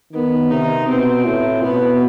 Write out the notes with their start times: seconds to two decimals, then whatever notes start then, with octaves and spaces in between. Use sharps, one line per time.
0.13 D#3 B3
0.50 C3 D#4
0.87 B2 C4
1.25 A2
1.62 B2 B3